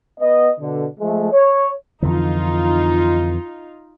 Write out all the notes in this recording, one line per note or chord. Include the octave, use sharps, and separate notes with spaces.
B3 D#5
B2 D3
F3 G#3 A3
C#5
F2 D3 E3 D#4 F4